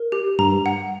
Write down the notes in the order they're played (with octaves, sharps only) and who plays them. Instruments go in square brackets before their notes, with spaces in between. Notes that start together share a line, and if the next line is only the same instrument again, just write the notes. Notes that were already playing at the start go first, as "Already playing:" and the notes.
Already playing: [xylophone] A#4
G4
[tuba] G2 [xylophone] A#5
[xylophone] F#5